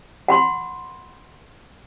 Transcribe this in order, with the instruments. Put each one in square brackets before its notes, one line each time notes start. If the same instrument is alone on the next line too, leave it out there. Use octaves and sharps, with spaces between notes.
[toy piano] F#5 B5 C6